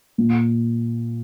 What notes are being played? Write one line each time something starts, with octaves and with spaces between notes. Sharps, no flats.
A#2